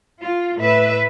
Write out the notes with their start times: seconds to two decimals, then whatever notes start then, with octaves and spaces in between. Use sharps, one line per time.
0.20 F4
0.58 A2 B4 E5